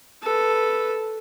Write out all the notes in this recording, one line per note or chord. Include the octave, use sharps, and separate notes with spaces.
A4 B4